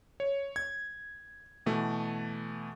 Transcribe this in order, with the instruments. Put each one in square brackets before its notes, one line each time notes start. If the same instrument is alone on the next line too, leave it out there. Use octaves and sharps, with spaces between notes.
[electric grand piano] C#5
G#6
B2 E3 A3